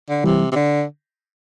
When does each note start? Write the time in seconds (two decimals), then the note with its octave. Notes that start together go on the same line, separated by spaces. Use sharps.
0.09 D3
0.24 C3 E3 G3
0.52 C3
0.55 D3